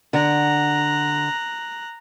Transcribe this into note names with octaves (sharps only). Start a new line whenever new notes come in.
D3 F#5 A#5 F#6